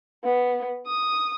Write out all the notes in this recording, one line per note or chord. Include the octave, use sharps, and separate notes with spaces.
B3
D#6